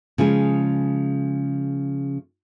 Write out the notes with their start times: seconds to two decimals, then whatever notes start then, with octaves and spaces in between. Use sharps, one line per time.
0.18 C#3 F3 G#3 G#4